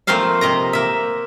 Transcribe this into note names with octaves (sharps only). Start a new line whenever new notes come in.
F3 A3 A#3 C4 C5 F5
C3 D#5 A#5
A#3 E5